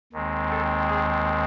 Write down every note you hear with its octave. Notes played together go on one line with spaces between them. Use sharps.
D#2 D#3 G#3 C4
A4
G#4